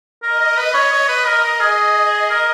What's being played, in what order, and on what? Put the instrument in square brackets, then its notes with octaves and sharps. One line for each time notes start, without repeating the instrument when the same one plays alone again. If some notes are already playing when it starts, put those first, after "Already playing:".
[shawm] A#4 [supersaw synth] D#5
[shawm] A#4
B4
C#5
C#5
B4
A#4
A#4
G#4
A#4